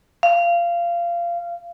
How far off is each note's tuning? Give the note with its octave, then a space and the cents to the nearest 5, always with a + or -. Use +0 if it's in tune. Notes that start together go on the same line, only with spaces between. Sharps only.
F5 -20